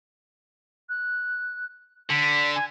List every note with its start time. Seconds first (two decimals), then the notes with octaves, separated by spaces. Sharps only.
0.89 F#6
2.10 D3 B6
2.55 G#5